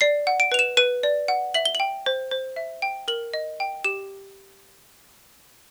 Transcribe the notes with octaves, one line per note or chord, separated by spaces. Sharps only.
D5 C7
F#5
D7
B4 F7
E7
B4 D#7
D5
F#5
E5 F#7
G7
G5 F#7
C5
C5
E5
G5
A#4 F#7
D#5
G5
G4 E7